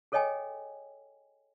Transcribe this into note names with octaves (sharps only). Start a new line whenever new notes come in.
G#4 A4 C#5 D#5 G5 G#5